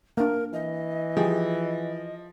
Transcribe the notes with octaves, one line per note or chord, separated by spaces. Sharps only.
A#3 D4 A#4
E3 D#5
F3 G4 G#4